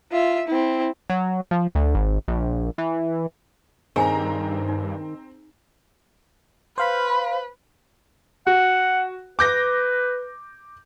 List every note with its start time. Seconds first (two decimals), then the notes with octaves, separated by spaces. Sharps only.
0.11 F4 E5
0.48 C4 E4
1.10 F#3
1.51 F3
1.75 D2
1.95 G#1
2.28 A#1
2.78 E3
3.96 G2 D#3 C4 G#4 G#5 A#5
4.68 D#4
6.78 B4 C5 F5 B5
8.47 F#4 F#5
9.39 B4 D6 G6 A#6